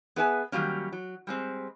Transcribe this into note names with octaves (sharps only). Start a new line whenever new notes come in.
B3 G#4 B4 E5 G5 G#5
D#3 F#3 G3 A#3 C#4
F#3
G3 G#3 C4